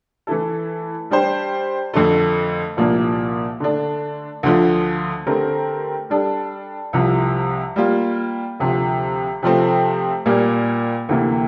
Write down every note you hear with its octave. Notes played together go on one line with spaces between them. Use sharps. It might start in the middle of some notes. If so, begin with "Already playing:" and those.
E3 A3 E4 A4
G3 D4 G4 C5
F2 D3 A3
C2 A#2 F3 A#3 D4
D3 A3 D4
D2 D3 F3
D3 A3 C4 G4 A#4
G3 D4 A4
C2 C3 F3
G3 A#3 F4
D2 C3 F3
C3 F3 A3 C4
A#2 G3 A#3
D2 C3 E3 A#3